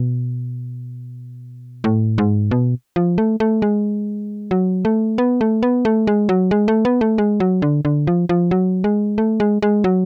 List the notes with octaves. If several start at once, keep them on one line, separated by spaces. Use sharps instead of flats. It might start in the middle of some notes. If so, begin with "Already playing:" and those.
Already playing: B2
A2
G#2
B2
F3
A3
A3
G#3
F#3
A3
B3
A3
B3
A3
G#3
F#3
G#3
A3
B3
A3
G#3
F#3
D3
D3
F3
F3
F#3
G#3
A3
G#3
G#3
F#3